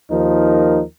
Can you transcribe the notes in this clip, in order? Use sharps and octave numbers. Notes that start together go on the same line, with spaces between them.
D#2 F3 D#4 A#4